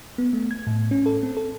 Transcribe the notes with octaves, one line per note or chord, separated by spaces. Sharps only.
B3
A3
G#6
A2
C#4
A4
C4
A4